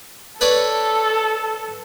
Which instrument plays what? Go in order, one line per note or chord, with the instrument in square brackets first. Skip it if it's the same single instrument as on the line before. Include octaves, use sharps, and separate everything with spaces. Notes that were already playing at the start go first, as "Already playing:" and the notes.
[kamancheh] A4 [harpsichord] B4 C#5 D5